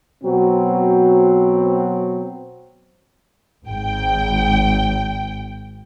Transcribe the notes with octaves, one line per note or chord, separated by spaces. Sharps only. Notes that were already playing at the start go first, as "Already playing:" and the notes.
B2 F#3 C4
G#1 G5